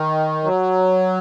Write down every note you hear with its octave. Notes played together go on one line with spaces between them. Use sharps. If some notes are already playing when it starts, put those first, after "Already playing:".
Already playing: D#3
F#3